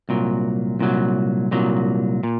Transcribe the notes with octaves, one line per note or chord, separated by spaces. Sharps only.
C2 A#2 F#3
C2 A#2 F#3
C2 A#2 F#3
A#2